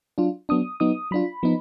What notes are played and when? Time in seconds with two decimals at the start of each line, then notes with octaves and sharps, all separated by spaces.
0.18 F#3 D4 F4
0.49 F#3 B3 D4 D#6
0.80 F#3 B3 D#4 D#6
1.11 F#3 D4 F4 B5
1.43 F3 B3 D#4